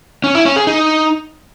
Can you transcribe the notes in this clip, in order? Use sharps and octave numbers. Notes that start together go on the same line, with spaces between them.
C#4
E4
C#4
G#4
D#4